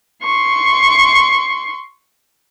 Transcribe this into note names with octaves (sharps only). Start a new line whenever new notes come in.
C6 C#6